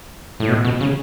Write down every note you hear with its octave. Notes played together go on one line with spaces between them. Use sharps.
A2
B2
B2
C#3